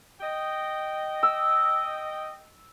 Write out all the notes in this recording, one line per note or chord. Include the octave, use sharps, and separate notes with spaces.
D#5 G5
E6